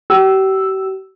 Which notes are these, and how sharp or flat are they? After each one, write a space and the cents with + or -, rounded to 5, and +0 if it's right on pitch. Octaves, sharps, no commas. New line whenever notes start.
G4 -40 E6 +0